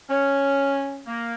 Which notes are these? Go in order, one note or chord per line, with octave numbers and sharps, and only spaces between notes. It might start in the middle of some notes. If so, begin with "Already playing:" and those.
C#4 C#5 F6
A#3